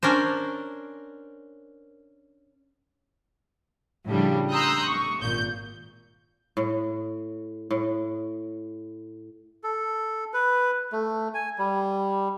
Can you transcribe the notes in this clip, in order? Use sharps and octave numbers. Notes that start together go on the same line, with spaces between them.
C#4 D4 A#4 C5
A2 C#3 F3 G3 D4
A#5 C6 D#6 E6 F#6 G6
C#6
G#1 A#2 G6
A2
A2
A4
B4
A3
G#5
G3